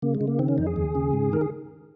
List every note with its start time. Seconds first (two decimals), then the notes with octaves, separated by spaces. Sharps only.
0.02 C#3 A#3
0.15 G#3
0.21 C#3
0.27 A#3
0.39 D#3 C4
0.48 C#4
0.58 F2 D#4
0.67 G#4
0.76 D#2
0.95 C#3
1.13 G#2
1.32 D#3 A#4
1.41 G#4